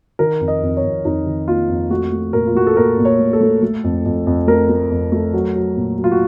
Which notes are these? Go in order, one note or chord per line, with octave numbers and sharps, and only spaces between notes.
D#3 A#4
F2
D#5
F2
C#5
F2
F2 D#4
D#3
A#3 F4
F2
A3 F#4
A3
A#2 A#4
F4
A3 F#4
A4
A#2 A#4
A#2
C#5
A3
A4
A3
A3
F2
F2
F2
A3 A#4
A3
F2
A3
F#3
F#3
A#2
F#3
F4
F#4